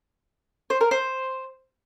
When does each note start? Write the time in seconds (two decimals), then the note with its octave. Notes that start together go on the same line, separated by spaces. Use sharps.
0.70 C5
0.81 A#4
0.91 C5